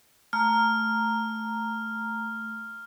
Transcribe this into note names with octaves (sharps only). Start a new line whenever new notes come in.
A3 A#5 F6